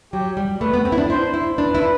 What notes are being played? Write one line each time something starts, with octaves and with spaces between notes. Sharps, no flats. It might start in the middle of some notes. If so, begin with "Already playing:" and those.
F#3 G4
G3
A3 B4
B3
C4
E4
D4
E4 C5
E4
D4 B4
E4